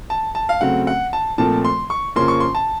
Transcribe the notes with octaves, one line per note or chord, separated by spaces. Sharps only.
A5
A5
F5
C#3 F#3 A3 C4 F#5
F#5
A5
A#2 F3 A3 C4 A5
C6
C#6
F2 C#3 F3 A#3 C#4 C6
C#6
C6
A5